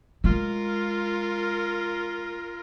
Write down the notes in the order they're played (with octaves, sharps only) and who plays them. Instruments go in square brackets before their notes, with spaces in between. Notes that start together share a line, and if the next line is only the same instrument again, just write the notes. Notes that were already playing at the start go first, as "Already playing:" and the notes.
[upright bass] G#3 [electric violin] F4 A#4